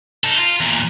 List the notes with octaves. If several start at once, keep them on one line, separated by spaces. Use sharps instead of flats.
D#4 A4
F4
E2 A#2